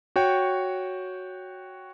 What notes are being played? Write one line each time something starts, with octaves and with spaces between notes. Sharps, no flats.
F#4 C#5 G5